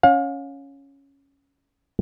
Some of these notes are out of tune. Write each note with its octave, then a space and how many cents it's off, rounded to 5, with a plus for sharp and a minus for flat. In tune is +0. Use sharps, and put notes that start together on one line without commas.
C#4 +0 F5 +35